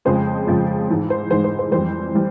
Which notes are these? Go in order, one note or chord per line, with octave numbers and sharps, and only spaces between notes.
F2 C#3 F3 G#3 C5
F2 C#3 F3 G#3
G#2 E3 G#3
C5
G#2 E3 G#3 C5
C5
C5
F2 E3 G3 C5
E3 G3